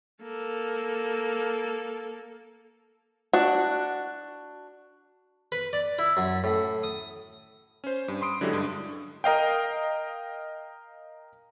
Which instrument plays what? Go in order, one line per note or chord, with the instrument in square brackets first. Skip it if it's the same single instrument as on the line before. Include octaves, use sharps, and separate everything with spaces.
[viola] A#3 A4
[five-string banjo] D4 F#4
[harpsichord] B4
D5
E4
F#2
A2
D#6
[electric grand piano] C#4 C5
G2
B5 C6 D#6 D7
D3 F#3 G#3 E4 G4 A4
G2 D3
A#4 D#5 F5 G5